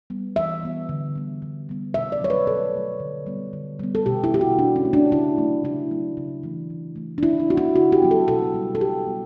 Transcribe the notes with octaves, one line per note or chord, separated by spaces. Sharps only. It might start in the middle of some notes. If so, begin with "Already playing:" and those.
G3 B3
E3 E5
G3 B3
D3
G3 B3
D3
G3 B3
B2 E5
D5
F#3 A3 C#5
B4
B2 A4
F#3 A3
D3
G3 B3
D3
G3 B3
A4
B2 G4
E4
A3 G4
F#4
B2 D4
C#4
A3
D4
C#3 E4
F#3 A3
C#3 E4
F#3 A3
C#3
E3 A3
C#3
E3 A3
D4
C#3 E4
D4
F#3 B3 E4 F#4
C#3 F#4
G4
F#3 B3
A4
B2 A4
G3 B3
A4
B2 G4
G3 B3